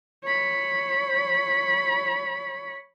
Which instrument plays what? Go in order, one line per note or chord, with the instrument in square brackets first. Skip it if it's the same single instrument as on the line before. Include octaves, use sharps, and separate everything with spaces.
[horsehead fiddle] C#5 B5